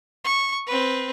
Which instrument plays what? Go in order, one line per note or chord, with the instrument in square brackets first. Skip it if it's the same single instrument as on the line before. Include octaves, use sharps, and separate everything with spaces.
[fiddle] C#6
C4 B4